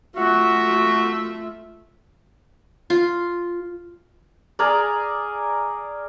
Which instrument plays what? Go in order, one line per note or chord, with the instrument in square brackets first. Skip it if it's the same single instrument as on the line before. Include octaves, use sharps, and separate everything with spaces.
[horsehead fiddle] A3 F4 [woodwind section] F#4 [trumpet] E5
[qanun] F4
[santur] G#4 A#4 D5